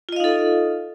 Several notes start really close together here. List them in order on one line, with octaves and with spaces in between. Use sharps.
F4 D#5 F5 D#4 A4